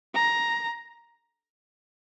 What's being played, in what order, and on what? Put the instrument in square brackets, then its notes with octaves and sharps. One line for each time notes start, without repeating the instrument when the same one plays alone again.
[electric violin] A#5